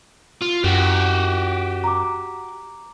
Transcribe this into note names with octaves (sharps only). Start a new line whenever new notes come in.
F4
F#2 F#4 G4
A#5 D6